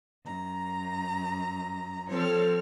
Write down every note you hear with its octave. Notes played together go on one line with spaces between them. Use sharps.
F#2 A#5
F3 C4 A4 C#5 F6